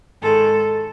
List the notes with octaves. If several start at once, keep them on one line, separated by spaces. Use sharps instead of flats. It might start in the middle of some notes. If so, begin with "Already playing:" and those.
G#2 D#3 G#3 A4